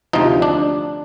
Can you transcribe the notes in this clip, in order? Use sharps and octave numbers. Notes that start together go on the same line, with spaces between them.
D2 C3 F3 D#4
D4